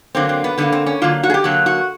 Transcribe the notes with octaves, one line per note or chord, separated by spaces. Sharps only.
D3 F#3 A#3 C4
C4
B3
D3 F#3 A#3 B3
C4
C#4
D3 F#3 A#3 F4
F#4
G#4
G4
D3 F#3 A#3 F#4
F#4